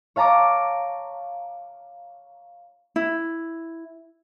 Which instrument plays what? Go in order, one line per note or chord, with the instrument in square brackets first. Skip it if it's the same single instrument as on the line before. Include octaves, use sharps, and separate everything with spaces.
[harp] C#5 F5 A5 A#5 D6
[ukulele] E4